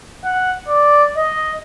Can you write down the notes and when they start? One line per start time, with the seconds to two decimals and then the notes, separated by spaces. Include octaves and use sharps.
0.25 F#5
0.68 D5
1.17 D#5